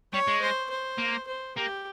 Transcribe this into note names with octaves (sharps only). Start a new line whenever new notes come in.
G3 C#5
G#3
C5
C5
A#3
C5
A#3 G4